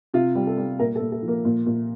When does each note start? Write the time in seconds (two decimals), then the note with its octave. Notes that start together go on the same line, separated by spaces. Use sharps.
0.14 C3 F4
0.35 G3
0.47 A4
0.57 G3
0.79 A#2 A#4
0.95 A4
1.00 A#2
1.12 A4
1.22 F3
1.28 A#3
1.45 A#2
1.66 A#2